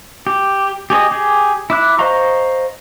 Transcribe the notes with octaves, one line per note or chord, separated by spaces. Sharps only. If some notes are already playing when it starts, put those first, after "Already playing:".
G4
G4 G#4 C#5 D#5
G4 G#4
E4 D6 F#6
C5 D#5 F5 A#5 C#6